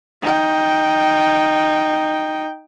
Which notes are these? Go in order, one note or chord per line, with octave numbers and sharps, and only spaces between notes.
D#4 G5